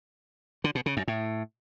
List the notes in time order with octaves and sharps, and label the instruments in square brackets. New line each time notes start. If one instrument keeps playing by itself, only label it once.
[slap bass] D3
B2
C#3
F#2
A2